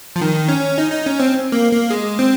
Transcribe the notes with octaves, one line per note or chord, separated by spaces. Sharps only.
F3
D#3
C#4
D#4
D#4
C#4
C4
A#3
A#3
G#3
C4